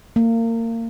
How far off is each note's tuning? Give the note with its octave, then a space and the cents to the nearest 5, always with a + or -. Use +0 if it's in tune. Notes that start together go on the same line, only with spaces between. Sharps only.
A#3 -30